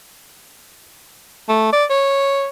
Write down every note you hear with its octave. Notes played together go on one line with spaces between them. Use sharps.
A3
D5
C#5